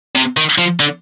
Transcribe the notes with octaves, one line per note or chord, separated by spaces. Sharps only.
C3
D#3
F3
D3